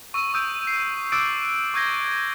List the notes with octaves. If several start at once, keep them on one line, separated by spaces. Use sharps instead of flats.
C#6 E6 D#7
D#6 E6 G6 D7
C7
D6 E6 F#6 A6 D7
C#6 E6 G6 G#6 A#6 G7